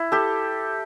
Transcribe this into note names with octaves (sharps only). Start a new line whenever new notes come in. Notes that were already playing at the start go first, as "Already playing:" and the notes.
Already playing: E4
G4 A4